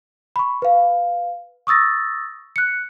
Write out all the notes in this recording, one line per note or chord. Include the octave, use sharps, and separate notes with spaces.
B5 C#6
B4 F5
C#6 D#6 E6 A6 A#6
F#6 C#7